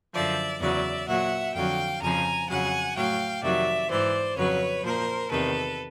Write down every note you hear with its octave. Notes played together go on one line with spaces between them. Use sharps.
F#2 D3 F3 D5 E5
E2 C#3 F#3 D5 E5
A#2 F#3 E5 F#5
F2 D3 F#3 F5 G5
F2 C#3 F3 G#5 A#5
F2 C#3 F#3 F#5 G#5
A2 F#3 F5 G5
F2 C3 D#3 F#3 D5 E5
G#2 E3 C5 D5
F2 C#3 F#3 B4 C#5
A#2 F3 A#4 C5
E2 C3 D#3 A4 B4